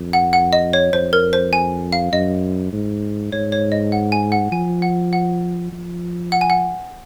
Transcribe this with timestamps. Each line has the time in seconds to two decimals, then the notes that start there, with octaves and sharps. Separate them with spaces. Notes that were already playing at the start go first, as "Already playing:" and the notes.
Already playing: F2
0.13 F#5
0.33 F#5
0.53 D#5
0.73 C#5
0.93 F2 C5
1.13 A#4
1.33 C5
1.53 G#5
1.93 F5
2.12 F#2 D#5
2.72 G#2
3.32 G#2 C#5
3.52 C#5
3.72 D#5
3.92 F#5
4.12 G#5
4.32 F#5
4.52 F3 G#5
4.82 F#5
5.13 F#5
5.72 F3
6.32 F#5
6.41 G#5
6.50 F#5